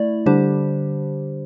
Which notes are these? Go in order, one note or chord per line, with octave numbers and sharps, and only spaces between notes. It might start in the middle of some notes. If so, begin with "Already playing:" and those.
Already playing: A3 E4 D5
D3 G3 D4 G4 C5